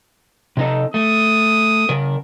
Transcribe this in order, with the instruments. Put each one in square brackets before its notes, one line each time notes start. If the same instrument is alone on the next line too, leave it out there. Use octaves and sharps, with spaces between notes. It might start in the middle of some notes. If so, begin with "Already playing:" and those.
[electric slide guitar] C3 D#4 A4
[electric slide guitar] A3 [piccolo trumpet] D#6
[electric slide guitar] C#3 A#4